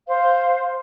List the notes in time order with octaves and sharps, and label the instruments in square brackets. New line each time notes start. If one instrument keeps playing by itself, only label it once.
[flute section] C5 F5